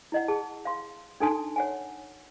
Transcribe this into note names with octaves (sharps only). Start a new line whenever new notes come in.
E4 D#5 F#5
G#4 A5
F5 C6
D4 D#4 A4 G#5 A5 C6
C#5 F#5 G#5